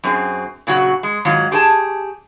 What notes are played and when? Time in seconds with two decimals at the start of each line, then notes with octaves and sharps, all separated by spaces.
0.04 F#2 C4 G#4
0.67 A#2 C#3 F#3 F#4
1.03 G#3
1.25 G#2 D#3 F#3 F4
1.52 G4 G#4 A5